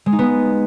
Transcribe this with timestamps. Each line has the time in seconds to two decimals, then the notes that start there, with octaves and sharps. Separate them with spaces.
0.06 G#3
0.12 D#4
0.19 B3